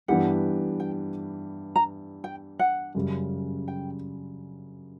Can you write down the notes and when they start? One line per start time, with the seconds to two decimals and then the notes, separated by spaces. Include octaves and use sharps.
0.08 G2 E3 B3 D4 G4 F#5
0.80 G5
1.76 A#5
2.24 G5
2.59 F#5
2.95 F#2 C#3 G3
3.68 G5